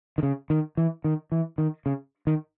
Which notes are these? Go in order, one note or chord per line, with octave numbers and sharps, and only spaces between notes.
D#3
C#3
D#3
E3
D#3
E3
D#3
C#3
D#3